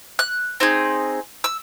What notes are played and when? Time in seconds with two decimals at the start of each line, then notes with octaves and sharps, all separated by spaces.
0.19 F#6
0.60 C4 D#4 G#4
1.44 E6